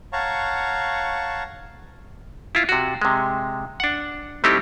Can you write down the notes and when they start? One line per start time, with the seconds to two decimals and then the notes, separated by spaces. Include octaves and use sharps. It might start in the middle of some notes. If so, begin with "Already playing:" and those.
0.13 C#5 F5 F#5 A5 A#5 C#6
2.55 E4 F4
2.69 C3 F#4
3.02 C3 G#3
3.80 D4 F#5
4.44 G3 A3 C4 D#4 E4 G4